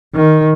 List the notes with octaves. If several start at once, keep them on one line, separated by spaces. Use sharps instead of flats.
D#3